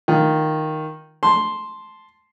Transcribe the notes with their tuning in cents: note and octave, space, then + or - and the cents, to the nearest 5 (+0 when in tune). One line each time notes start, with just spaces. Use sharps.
D#3 +0 F4 +0
A5 -5 C6 +0